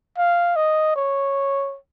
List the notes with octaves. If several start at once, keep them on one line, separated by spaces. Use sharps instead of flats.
F5
D#5
C#5